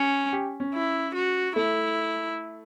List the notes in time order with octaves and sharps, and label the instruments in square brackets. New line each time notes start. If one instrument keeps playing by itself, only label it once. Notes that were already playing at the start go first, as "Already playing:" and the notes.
Already playing: [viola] C#4
[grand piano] G4
C#4
[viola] E4
F#4
[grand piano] A3 [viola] E4